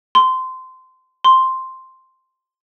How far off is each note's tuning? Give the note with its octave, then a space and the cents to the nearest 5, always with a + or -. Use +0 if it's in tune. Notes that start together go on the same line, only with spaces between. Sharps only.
C6 -20
C6 +0